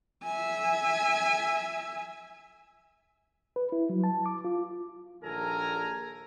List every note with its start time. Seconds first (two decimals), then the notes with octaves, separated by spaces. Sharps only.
0.23 E5 G#5
3.56 B4
3.72 E4
3.89 F#3
4.04 A5
4.26 D6
4.45 F4
5.22 A#1 D#2 A4 A#4 G#5 A#5